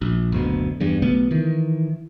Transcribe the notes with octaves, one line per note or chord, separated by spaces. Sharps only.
A#1
F#1 D2 B2
E2 G2
B1 C#3 A3 B3
D#3 E3